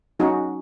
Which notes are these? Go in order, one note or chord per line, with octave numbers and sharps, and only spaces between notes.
F#3 C#4 D#4 F#4